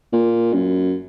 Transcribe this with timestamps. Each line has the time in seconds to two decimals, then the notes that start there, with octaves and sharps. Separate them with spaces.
0.13 A#2
0.53 F#2